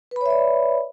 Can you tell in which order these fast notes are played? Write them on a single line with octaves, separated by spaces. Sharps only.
B4 B5 C#5 E5 D5